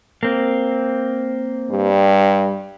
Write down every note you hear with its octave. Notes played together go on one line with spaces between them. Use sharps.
A#3 C4
G2 G3